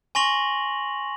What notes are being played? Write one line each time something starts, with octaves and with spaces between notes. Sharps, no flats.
G#5 C6 C#6 A#6 F7 F#7